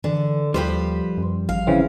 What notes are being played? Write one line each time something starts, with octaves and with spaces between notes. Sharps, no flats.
D3 E3
D#2 F3 G3 G4 B4 C5
F#2
A1 F5
C#3 E3 C4